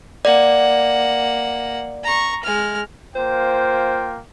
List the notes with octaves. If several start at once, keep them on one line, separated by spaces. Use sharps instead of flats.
A#3 D5 F#5
A#5 C#6
G#3 F6
A#3 F4 C5 G5